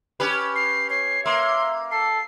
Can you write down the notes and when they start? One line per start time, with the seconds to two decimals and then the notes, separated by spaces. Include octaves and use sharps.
0.20 C#4 G4 B4
0.56 C7
0.90 C#5 C7
1.26 A#3 E5 C6
1.91 A4 C7